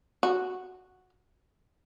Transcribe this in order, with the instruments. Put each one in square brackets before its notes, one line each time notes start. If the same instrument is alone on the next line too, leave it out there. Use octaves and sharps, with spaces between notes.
[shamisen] F#4